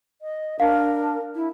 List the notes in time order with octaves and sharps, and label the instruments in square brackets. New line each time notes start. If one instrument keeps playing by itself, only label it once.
[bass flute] D#5
[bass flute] D4 [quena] A#4 [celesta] F5
[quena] E4